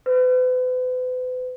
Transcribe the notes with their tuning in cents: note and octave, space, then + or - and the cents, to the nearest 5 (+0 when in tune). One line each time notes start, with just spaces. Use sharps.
B4 +40